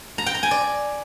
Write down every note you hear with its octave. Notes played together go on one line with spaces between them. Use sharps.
A#5
G5
A#5
G#5
D5